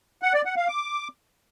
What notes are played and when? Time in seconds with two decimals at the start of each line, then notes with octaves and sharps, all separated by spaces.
0.22 F#5
0.34 D5
0.45 F#5
0.56 F5
0.68 D6